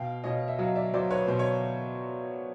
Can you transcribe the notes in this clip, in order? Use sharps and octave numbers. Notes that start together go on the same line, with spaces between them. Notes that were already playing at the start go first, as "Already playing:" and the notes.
Already playing: B2 F5 G5
B2 C#5 D#5
E5
F#3 D#5 F5
D5 E5
F#3 C5 D5
B4 C#5
B2 C5
C#5